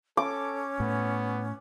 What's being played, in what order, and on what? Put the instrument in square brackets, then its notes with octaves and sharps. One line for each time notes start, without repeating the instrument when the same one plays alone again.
[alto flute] C#4 [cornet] A4 [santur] D6
[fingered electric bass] A2 [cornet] B3